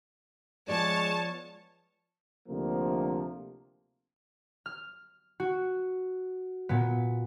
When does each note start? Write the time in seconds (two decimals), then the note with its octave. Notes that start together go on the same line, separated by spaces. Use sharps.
0.68 F3 G#3 B3 C#5 D5 A5
2.48 D2 C3 F3 A#3
4.66 F6
5.40 F#4
6.69 A#2 B3